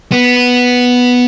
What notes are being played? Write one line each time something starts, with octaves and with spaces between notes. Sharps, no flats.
B3